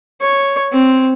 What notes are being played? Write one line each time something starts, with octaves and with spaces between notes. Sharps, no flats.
C#5
C4